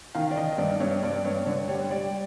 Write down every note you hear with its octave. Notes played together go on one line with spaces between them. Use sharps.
D#3 F5
D5
D#3 D#5
D#5
G2 D5
G2 C#5
G2 D5
G2 C#5
D3 C#5
G3 C#5
G3 D5